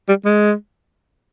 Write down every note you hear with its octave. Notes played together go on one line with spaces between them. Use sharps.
G3
G#3